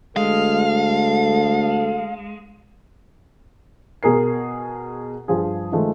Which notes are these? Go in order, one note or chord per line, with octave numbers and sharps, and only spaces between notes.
D2 G#3 A4 F5
B2 G#4 A#4 C7
G2 F3 G#4
D#3 F3 G#3 A3